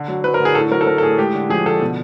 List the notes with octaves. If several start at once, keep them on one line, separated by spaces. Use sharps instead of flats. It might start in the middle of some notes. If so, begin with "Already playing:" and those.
Already playing: D3
F#3
F#3 B4
A#4
D3
G#4
A2 A4
F#3 A#4
A4
F#3 A#4
A4
A2 G#4
G#3 G4
D3
F3 G#4
D3 A4
B2